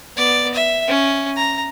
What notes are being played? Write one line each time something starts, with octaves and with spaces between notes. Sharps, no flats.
B3 D5
E5
C#4
A#5